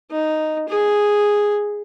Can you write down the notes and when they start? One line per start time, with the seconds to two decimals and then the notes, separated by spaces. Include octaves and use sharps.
0.11 D#4
0.68 G#4